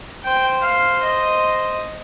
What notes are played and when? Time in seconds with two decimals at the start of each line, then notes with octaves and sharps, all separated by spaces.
0.25 C5 G5
0.64 F5
1.03 D#5